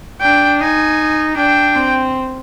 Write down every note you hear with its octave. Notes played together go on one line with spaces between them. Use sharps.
D4 G5
D#4 G#5
D4 G5
C4